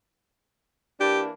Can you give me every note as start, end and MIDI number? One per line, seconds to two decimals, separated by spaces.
1.00 1.30 52
1.00 1.30 58
1.00 1.30 62
1.00 1.22 67